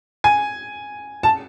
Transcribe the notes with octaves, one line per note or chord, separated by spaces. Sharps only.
G#5
A5